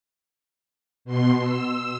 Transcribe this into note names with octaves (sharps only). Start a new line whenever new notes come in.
B2 C6
E6